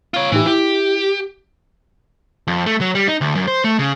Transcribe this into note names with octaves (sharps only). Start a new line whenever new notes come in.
F4 C#5
A2 E3 D#4 G4
E4 G4
F2
A3
F#3
G3
D#4
D2
F#2
C5
A3
C#3